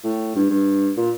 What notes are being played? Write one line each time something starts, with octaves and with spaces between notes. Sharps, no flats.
A2
G2
G2
A#2